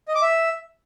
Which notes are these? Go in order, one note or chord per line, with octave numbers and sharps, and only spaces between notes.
D#5
D6
E5